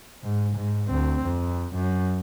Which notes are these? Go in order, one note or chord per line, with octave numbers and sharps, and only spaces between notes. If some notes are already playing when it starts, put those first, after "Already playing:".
G#2
G#2
D2 C4
F2
F#2